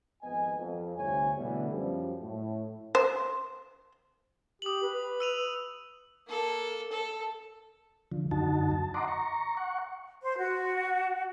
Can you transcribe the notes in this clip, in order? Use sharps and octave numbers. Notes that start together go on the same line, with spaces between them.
G#1 F2 B3 D#5 G#5
F2
G1 D2 C3 E4 C#5 G#5
B2 D3 E3 G3 A3 B3
F#2 F3 G3
A2
C5
G4 D#6 F#7
B4
E6 D#7 F7
A#3 A4
A4
D3 F3
F#2 D3 D#4 F#4 A5
A5
D#5 F#5 A#5 C6 D6
A#5 C#6
F#5 C#6
C5
F#4